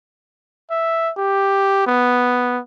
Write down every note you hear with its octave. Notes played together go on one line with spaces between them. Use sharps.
E5
G4
B3